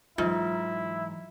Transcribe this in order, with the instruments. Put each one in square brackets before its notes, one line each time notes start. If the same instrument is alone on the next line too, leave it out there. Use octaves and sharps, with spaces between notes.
[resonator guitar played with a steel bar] G#2 [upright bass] E3 F#3 [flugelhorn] E4 [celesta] F4